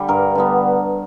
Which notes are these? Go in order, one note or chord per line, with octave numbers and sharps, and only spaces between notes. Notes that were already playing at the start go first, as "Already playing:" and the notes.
Already playing: D3 G3
G2 A#4
D3 G3 B3